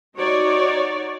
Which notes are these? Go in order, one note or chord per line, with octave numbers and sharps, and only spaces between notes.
D#4 F#4 C#5 D5